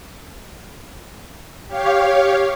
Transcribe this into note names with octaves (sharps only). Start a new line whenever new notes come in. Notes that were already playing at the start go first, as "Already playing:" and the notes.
G4 C#5 F5